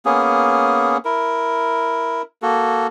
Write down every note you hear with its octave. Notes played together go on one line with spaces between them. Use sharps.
A#3 B3 C#4 G#4
E4 A#4
A#3 F#4 A4